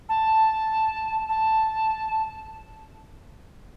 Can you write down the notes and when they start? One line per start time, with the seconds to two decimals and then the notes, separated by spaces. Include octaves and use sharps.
0.08 A5
1.29 A5